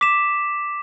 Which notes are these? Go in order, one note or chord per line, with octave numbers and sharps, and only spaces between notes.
D6 B6 E7